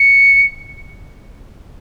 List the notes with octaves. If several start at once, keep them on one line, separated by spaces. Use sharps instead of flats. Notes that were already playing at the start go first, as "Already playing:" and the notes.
Already playing: C#7